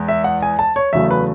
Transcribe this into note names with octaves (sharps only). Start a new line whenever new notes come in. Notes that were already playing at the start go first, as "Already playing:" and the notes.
Already playing: E2 G#3
E5
F#5
G#5
A5
C#5
E2 C#3 F#3 A3 E5
B4